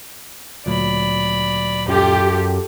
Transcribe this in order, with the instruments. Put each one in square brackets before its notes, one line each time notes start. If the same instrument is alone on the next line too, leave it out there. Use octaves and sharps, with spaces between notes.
[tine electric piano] D2 A#2 F#3 [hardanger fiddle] D5 B5
[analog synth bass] F#2 [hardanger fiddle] F4 A4 [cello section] G4